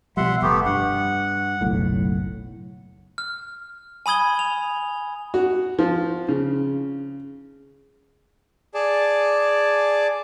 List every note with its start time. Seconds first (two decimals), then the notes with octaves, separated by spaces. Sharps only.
0.17 B2 F3 G3 E5 F#5 C6
0.42 F1 A3 B3 G4
0.66 G2 F#5
1.61 F#1 B1 A2
3.18 F6
4.06 G#5 B5 D#6 G#6 G7
4.39 F7
5.34 F#4
5.79 F3
6.29 C#3
8.74 G#4 D5 A5